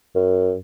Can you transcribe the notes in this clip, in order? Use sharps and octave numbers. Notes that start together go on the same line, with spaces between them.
F#2